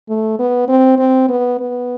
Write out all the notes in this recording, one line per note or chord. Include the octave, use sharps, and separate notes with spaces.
A3
B3
C4
C4
B3
B3